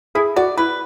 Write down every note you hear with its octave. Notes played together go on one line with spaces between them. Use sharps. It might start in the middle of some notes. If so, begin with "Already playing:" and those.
E4 G#4
F#4 D5
E4 B4